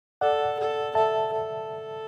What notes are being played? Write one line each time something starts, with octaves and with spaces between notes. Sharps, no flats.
A4 D5 F#5
A4
A4 E5 A5
A4